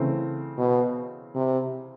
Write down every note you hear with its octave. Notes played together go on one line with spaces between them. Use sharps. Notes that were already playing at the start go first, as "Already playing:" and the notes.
Already playing: C#3 E3 A3 C4
B2
C3